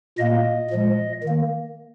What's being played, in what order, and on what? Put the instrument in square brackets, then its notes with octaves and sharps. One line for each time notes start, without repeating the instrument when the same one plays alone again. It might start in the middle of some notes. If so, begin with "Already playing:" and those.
[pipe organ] A#2 A#3 D#5
A#2 F3 G#3
D#3 A#3